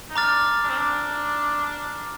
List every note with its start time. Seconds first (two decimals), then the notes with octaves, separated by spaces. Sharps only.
0.10 D#4
0.15 D4 A#5 D6 F6 A6
0.63 D4
0.70 C4
0.77 D4